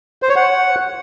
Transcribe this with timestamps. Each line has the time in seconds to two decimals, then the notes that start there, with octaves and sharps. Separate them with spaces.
0.22 C5
0.29 C#5
0.36 F#5